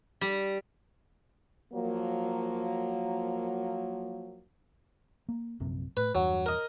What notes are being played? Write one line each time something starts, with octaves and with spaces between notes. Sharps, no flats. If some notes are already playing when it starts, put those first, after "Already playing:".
G3
F3 F#3 A#3
A#3
A#1 F#2 C3
A2 B4
E2 G2 F#3
A#4 D#5